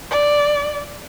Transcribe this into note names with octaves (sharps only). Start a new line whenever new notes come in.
D5